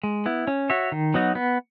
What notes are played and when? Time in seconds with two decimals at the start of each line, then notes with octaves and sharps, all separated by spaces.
0.03 G#3
0.26 B3 E4
0.47 C#4
0.70 F#4 C#5 E5
0.92 D#3
1.14 F#3 B3 D#4 F#4
1.35 B3